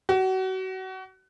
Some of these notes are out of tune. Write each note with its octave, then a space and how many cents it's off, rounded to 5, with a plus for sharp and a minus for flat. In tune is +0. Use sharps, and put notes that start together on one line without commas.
F#4 +30